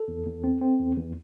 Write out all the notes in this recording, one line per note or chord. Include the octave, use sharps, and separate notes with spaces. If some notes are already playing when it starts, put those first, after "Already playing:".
Already playing: A4
E2
E2
C4
C4
E2
E2